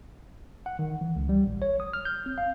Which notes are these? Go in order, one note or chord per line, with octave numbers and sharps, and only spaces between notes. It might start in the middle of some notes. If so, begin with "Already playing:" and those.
F#5
D#3
E3
C#2
G3
A1
C#5
D#6
F6
G6
C4
F5